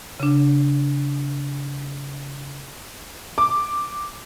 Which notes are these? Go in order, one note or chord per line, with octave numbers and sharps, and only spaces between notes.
C#3 D4
D6